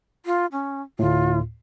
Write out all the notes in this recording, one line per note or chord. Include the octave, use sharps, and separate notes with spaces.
F4
C#4
D2 A2 F4